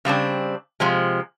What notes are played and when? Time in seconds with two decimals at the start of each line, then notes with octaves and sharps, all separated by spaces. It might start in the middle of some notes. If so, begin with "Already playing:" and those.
0.05 C#3 G3 C4 D4
0.80 C3 F3 G#3